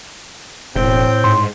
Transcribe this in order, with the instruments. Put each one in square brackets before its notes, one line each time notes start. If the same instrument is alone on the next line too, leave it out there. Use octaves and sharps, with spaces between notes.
[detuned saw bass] E1 [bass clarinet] A2 [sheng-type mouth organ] C4 G5 G6
[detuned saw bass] G#2 [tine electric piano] C6